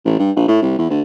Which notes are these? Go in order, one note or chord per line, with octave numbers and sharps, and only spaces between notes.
A1
G2
A#1
A2
C2
E2
D2